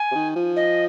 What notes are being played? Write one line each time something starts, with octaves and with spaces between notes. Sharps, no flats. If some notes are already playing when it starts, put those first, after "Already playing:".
Already playing: G#5
C3
D#3
F3
D#5